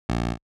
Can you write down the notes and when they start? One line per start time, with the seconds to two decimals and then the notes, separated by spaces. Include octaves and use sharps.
0.09 A#1